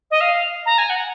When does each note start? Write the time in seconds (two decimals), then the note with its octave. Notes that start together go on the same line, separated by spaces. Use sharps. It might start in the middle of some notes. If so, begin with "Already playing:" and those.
0.11 D#5
0.21 F5
0.66 A#5
0.78 G#5
0.90 F#5